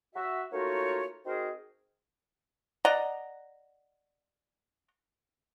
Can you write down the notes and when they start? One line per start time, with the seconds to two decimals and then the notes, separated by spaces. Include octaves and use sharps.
0.14 F#4 E5
0.52 A3 A#3 D#4 F4 F#4 C#5
1.25 C4 D#4 F#4 G#4 A#4 C5
2.85 D5 D#5 F#5 A#5